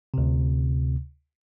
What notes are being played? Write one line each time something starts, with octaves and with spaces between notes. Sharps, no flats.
D2 C3